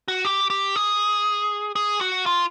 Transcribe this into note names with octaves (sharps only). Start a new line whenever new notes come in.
F#4
G4
G4
G#4
G#4
F#4
F4